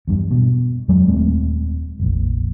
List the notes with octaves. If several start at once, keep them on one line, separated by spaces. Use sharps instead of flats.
E2 G2
B2
F2 F#3 G#3
D#1 G#3 A3 C4
F1 A#1